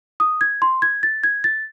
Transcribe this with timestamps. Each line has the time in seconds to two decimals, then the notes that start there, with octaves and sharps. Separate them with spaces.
0.20 D#6
0.41 G#6
0.62 C6
0.82 G#6
1.03 A6
1.24 G#6
1.44 A6